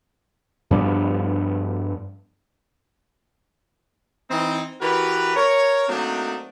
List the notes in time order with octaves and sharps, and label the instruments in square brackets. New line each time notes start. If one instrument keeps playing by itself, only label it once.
[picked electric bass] G2 F3 B3 D4
[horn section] E3 C4 D#4
E3 F#4 G4 A#4 B4
A#4 C#5
F#3 A3 A#3 C4 D4 D#4